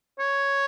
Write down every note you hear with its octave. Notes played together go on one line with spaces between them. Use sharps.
C#5